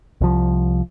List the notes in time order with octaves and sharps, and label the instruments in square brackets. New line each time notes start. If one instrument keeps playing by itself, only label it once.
[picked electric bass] C2 F3